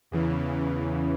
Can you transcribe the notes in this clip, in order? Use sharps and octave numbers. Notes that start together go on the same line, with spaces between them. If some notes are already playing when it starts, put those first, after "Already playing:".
E2 C#3 E3